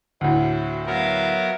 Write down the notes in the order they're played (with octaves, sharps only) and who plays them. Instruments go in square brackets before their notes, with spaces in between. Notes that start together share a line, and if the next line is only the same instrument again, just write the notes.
[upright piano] D2 A2 [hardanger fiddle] E4 F#4
[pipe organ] F#3 B3 A#4 [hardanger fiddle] E5 F5